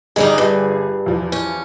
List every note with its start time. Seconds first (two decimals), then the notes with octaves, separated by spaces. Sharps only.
0.16 G1 D#3 G3 D#4 G#4
0.38 G2
1.06 E2 F3
1.32 C#4